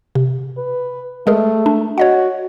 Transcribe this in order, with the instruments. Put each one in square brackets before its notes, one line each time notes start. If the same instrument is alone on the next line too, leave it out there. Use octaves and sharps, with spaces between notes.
[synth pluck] C3
[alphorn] B4
[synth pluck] G#3 G#4 A#4 [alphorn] A3
[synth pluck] D4
[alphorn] F#4 [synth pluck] C#5 D#5 F#5